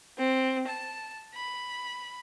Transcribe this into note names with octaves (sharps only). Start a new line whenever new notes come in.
C4
A5
B5